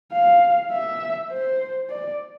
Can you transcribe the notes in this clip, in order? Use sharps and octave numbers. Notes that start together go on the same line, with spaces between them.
F5
E5
C5
D5